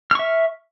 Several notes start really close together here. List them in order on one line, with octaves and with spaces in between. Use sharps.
F6 C#6 E5